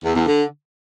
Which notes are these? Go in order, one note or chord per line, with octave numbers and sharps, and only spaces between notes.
E2
E2
D3